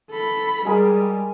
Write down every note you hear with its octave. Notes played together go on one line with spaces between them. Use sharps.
A4 B5
G3 G#3 G#4 A#4